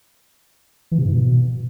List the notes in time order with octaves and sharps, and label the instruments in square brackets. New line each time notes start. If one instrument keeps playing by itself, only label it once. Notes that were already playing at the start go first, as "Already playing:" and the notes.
[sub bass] E3
C3
G#2
B2